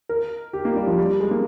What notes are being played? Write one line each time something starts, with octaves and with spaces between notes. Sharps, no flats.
A#4
G4
A#3
G3
F3
G3
G#3
A#3